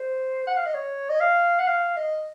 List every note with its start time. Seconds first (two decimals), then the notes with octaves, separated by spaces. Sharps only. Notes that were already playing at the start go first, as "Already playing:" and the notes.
Already playing: C5
0.47 F#5
0.57 F5
0.66 D#5
0.75 C#5
1.10 D#5
1.20 F5
1.59 F#5
1.67 F5
1.97 D#5